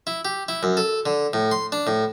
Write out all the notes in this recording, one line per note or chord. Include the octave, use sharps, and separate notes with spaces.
E4
G4
E4
F#2
A4
D3
A2
C6
D4
A2